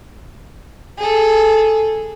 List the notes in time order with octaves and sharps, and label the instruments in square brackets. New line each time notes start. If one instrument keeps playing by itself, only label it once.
[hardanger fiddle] G#4 A4